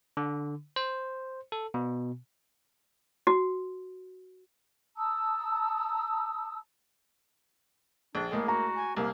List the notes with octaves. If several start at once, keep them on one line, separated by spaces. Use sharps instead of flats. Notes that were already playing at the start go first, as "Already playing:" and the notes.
D3
C5
A4
B2
F#4
A5 A#5 D#6 E6
A#1 D4
A2 G#3 A#3 G#4
F#4 A#5
G#5
C2 A#3 G4